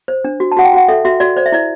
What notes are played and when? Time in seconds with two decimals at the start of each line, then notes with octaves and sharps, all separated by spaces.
0.08 C5
0.24 D4
0.40 F#4
0.52 A5
0.57 F#4 F#5
0.65 G5
0.73 F#4 F#5
0.88 A4 E5
1.05 F#4 E5
1.20 F#4 D5
1.37 C5 D5
1.46 E5
1.52 E4 D5